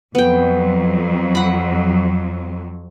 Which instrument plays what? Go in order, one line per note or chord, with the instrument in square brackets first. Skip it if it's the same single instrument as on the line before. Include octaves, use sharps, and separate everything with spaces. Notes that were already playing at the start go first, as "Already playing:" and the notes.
[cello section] F2 F#3 [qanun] B3 G5
[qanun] F#5 B5